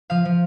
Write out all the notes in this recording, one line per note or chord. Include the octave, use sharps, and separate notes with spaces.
F3 F5
F3